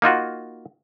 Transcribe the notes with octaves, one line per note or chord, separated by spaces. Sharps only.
A#3 D#4 F4 F#4